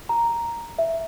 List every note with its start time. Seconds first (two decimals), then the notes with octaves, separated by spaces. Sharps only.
0.09 A#5
0.79 E5